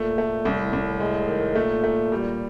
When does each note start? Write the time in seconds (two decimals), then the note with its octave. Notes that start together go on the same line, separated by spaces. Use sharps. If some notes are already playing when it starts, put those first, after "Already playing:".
Already playing: A#2 A3
0.18 A3
0.45 C2 A2
0.73 C2
1.00 G#3
1.28 D#3
1.55 A#2 A3
1.84 A3
2.12 G3